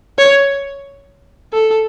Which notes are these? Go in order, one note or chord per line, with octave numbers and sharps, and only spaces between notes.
C#5
A4